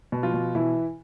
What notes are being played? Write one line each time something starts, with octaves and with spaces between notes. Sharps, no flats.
B2
F3 F4
B2
B2 E3 E4